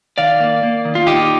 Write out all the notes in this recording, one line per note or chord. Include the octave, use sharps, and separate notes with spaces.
D#3 D5 F5
A#3
A#3
D#3
F4
A#2 D#4 G4